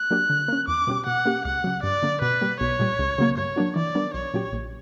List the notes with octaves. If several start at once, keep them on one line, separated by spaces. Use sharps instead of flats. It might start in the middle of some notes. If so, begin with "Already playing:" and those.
Already playing: F#6
F#3 A#3 D4 G4
D3
A#3 C#4
E2 D6
B2 G3 C#4 G4
B2 F#5
A#3 C#4 G4
C#2 F#5
C#3 F#3
G2 D5
D3 A#3
B2 B4
G3 A#3
B1 C#5
A#2 G3
C#2
C#3 F#3 A#3
G2 C#5
F#3 A#3 D4 F#4
E3 D5
G3 B3 D4 A#4
B1 C#5
A#2 F#3 C#4 G4
A#1